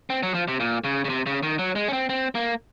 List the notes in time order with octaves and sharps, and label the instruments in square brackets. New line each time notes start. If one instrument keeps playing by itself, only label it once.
[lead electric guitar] C4
F#3
F3
C3
A#2
C#3
C#3
C3
C#3
D#3
F#3
G#3
C#4
C4
C4
A#3